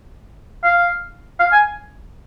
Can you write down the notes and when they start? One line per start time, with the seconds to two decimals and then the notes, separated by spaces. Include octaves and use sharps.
0.63 F5
1.39 F5
1.52 G#5